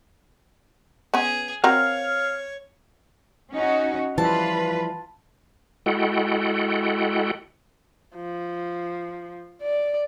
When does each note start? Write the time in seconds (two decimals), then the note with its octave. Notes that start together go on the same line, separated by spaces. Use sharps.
1.14 B3 C#4 G#4
1.64 C4 F#4 A#4 C#5 F5
3.53 C#4 D#4 F#4
4.18 E3 F3 G3 F4 B4 A5
5.86 G#3 E4 F#4 A4 F#5 G5
8.16 F3
9.62 D5